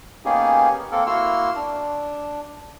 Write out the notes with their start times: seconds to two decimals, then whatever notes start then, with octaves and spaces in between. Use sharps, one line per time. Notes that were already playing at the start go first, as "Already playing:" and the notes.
0.25 A#3 B3 C#4 D#4 G4 G#4
0.92 A#3 C4 A4 A#4
1.07 A#3 E4 F#4 C6 E6 F6
1.55 D4